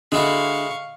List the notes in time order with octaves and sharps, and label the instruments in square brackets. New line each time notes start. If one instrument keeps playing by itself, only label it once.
[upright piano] D3 [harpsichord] G#3 E4 F#4 [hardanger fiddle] F5 C#6